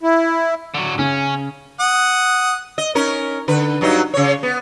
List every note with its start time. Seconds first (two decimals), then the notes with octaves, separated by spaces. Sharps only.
0.03 E4
0.74 D3 F#3
0.99 C#3 C#4
1.80 F#5 D#6
2.78 D#5
2.95 C#4 D#4 A#4
3.48 D3 B4
3.81 G2 F#3 D#4
4.14 C#3 C#5
4.43 B3